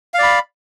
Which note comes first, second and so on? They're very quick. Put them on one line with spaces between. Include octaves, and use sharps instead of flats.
F5 D5 B5